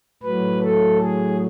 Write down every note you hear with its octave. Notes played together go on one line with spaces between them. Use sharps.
A2 F#3 B4
A4
G#4